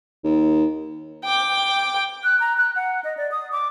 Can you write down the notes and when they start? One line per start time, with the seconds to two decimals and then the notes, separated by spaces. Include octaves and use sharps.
0.24 D#2
1.25 G5 D6
2.24 F#6
2.40 A#5
2.57 F#6
2.76 F#5
3.04 D#5
3.17 D5
3.31 D#6
3.52 D6